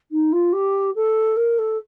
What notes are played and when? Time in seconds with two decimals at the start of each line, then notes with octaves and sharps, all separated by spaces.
0.11 D#4
0.32 F4
0.53 G4
0.95 A4
1.37 A#4
1.59 A4